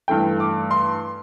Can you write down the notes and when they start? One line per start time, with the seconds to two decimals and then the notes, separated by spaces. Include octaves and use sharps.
0.08 G2 E3 A3 G5
0.40 D6
0.71 C6